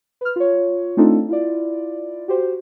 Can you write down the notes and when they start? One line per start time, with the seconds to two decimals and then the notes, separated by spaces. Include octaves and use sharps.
0.21 B4 F6
0.36 F4 C#5
0.97 A3 C4 D4 D#4 F4 A4
1.28 E4 F4 D5
2.28 F#4 G4 C5